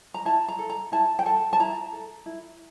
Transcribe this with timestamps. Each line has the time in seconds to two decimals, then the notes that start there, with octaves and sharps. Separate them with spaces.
0.14 A#5
0.25 E4 A5
0.48 A#5
0.59 A4
0.70 A#5
0.92 E4 A5
1.19 G5
1.25 A4 A5
1.53 A5
1.60 E4 A#5
1.93 A4
2.26 E4